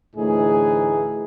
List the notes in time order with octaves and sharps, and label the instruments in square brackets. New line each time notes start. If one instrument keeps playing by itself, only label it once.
[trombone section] D2 A2 E3 D#4 G#4